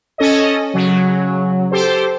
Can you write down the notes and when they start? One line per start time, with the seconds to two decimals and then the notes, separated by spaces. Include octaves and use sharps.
0.18 C#4 A4 C#5 D#5
0.74 C#3 F#3
1.71 G4 A4 C5